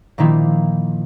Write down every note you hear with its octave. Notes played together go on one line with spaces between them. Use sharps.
A#2 D#3 F3 A#3 E4 F4